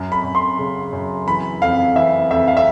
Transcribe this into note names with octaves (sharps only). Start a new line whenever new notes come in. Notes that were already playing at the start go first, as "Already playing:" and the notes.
Already playing: F#2
B5
F#2
C6
C#3
F#2
E3 B5
F2 F5
E3 E5
F2 E5
F5
E5